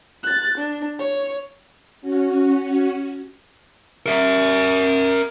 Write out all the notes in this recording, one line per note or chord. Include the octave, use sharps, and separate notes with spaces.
F#6 A6
D4
C#5
C#4 F#4
A#4 E5